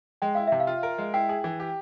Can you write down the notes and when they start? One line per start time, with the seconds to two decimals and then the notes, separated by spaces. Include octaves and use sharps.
0.22 G#3 G5
0.35 E4 F5
0.47 C3 E5
0.60 F5
0.67 F4
0.83 A#4
0.98 G#3
1.14 E4 G5
1.29 G#4
1.44 E3
1.60 G4